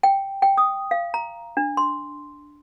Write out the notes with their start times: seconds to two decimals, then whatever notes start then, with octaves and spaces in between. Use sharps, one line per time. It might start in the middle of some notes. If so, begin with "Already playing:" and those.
0.03 G5
0.42 G5
0.58 D#6
0.91 F5
1.14 A#5
1.57 D4
1.77 C6